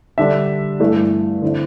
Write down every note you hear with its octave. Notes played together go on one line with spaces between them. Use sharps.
D3 G3 D4 E5
G2 E3 A3 E4
D3 C4 E4